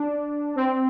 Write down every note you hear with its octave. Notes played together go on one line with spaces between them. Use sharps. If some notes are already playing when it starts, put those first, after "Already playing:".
Already playing: D4
C4